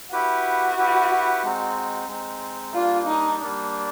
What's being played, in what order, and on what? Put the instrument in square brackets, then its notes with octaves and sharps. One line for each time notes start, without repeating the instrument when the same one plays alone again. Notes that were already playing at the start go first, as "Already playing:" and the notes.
[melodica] E4 G4 B4 [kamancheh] F#4
[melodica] E4 G4 B4
G#3 C4 D#4
G#3 C4 D#4
[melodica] G3 A#3 D4 [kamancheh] F4
[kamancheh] D#4
[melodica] G3 A#3 D4